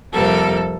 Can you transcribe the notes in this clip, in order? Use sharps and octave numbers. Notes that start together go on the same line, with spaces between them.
F2 C3 G3 A#3 A4